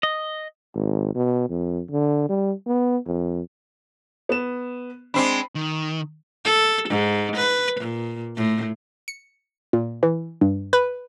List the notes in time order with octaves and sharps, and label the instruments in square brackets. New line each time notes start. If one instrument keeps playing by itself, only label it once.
[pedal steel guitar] D#5
[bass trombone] G#1
B2
F2
D3
G3
B3
F2
[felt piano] B3 E7
[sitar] G#3 C4 D4 [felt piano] B5 C7
[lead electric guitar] D#3
[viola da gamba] A4
G#2
B4
A#2
A2
[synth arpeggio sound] C#7
A#2
E3
G2
B4